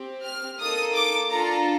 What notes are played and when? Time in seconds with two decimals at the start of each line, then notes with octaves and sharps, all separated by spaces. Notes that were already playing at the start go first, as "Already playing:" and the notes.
Already playing: C4 G4
0.24 F6
0.59 A#3 D#4 A4 D#6
0.95 D6
1.30 D4 F4 A4 A#5